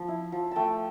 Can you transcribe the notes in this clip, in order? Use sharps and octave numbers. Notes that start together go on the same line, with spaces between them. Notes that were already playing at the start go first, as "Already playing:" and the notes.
Already playing: F3
E4
F3
A3 G5 A5